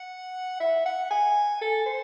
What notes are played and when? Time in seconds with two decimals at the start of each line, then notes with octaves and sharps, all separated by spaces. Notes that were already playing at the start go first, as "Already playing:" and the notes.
Already playing: F#5
0.60 E5
0.86 F#5
1.11 G#5
1.62 A4
1.86 C5